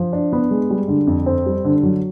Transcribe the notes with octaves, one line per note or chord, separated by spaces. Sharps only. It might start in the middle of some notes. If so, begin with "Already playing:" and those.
Already playing: F3
D4
B3
G#3
G3
D3
F2
C4
G3
D3
F#3